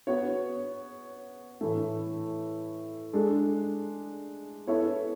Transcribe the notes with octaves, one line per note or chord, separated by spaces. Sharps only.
B3 F#4 C#5
A2 E3 A3
G#3 D4 A4
B3 E4 A4 C#5